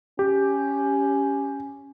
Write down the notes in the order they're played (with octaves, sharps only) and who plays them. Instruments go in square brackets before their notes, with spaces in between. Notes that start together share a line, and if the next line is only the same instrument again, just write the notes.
[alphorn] C#4 [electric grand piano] G4